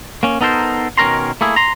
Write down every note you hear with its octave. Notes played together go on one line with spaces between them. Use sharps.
A#3 C#4
B3 D#4 A4 A#4 C5
B2 D#3 C#4 A#4 A#5 C6
A3 A#3 E4 G#4
A#5 C6